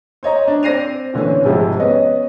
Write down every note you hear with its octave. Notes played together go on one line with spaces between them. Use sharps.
C5 C#5 D#5 A#5
D4
C4 D5 A#6 C7 D#7 F7
A#2 D3 E3 C4 C#4
G#1 C3 F3 G3 G#3
B3 C#4 D#5